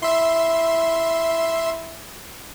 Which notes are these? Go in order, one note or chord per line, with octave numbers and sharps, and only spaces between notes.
E4 E5 C6